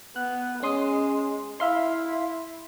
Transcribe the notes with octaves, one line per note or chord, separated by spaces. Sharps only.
B3 F#6
G#3 C#4 C6 D#6
E4 E5 F5 C6